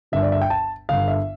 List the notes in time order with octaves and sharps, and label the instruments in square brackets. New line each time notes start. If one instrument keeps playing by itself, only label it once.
[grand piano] G1 G2 D3 E5
D5
E5
G5
A5
G1 G2 D3 F5
E5